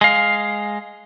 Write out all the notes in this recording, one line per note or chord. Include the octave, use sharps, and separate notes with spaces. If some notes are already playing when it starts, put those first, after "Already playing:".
G#3 F5